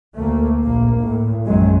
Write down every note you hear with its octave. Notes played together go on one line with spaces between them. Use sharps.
D2 A3 A#3
A#1 A#3
A2
A#1 F#2 D#3 F#3 G#3